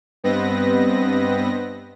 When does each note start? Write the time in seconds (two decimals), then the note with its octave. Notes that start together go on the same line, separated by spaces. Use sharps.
0.24 G2 B3 C4 B4 D#5 A#6